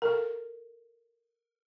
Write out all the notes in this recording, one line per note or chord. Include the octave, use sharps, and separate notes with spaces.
A4 A#4